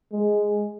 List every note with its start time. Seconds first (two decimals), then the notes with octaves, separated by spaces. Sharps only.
0.12 G#3